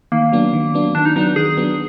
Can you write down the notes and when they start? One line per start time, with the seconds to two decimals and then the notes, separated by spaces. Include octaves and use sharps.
0.12 D#3 A#3
0.32 F#3 B3 D4
0.53 D#3
0.74 F#3 B3 D4
0.95 D#3 D4
1.05 D#4
1.16 F#3 B3 D4 D#4
1.36 D#3 G#4
1.57 F#3 B3 D4